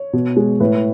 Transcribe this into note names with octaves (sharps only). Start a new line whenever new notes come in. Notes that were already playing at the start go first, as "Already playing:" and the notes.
Already playing: C#5
B2
G#3
A2 B4